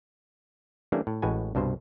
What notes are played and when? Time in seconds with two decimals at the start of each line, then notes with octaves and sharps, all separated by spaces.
0.92 E3 G3 A3 A#3 C#4 D4
1.07 A2
1.22 A1 A2 G#3 F#4 B4 G#5
1.55 C2 G2 B2 C5